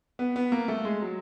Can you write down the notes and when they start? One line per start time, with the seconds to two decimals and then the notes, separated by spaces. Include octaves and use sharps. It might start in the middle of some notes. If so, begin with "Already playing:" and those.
0.19 B3
0.36 B3
0.52 A#3
0.68 A3
0.85 G#3
1.02 F#3